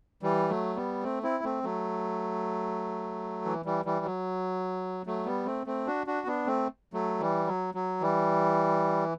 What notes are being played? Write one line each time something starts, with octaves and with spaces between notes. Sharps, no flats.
E3 G3
F#3 A3
G3 B3
A3 C4
C4 E4
A3 C4
F#3 A3
E3
E3 G3
E3 G3
F#3
F#3 A3
G3 B3
A3 C4
A3 C4
D4 F#4
D4 F#4
B3 D4
A3 C4
F#3 A3
E3 G3
F#3
F#3
E3 G3